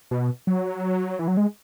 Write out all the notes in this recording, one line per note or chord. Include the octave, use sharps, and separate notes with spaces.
B2
F#3
E3
F#3
G#3